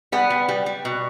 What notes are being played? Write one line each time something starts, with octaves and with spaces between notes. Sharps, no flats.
G3 B3
G3
G3
G3
B2